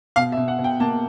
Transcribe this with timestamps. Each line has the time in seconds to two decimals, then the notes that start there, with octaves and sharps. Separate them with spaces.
0.16 B2 F5
0.32 E5
0.37 B2
0.48 F#5
0.59 B2
0.64 G5
0.80 A#3 A5